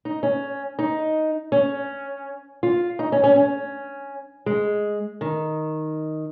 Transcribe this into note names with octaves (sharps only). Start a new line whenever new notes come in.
D#4
C#4
D#4
C#4
F4
D#4
C#4
C#4
C#4
G#3
D#3